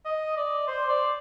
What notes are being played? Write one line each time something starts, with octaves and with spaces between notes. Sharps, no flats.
D#5
D5
C5
D5